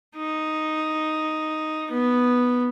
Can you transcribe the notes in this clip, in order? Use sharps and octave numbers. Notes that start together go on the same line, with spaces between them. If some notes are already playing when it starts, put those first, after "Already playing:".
D#4
B3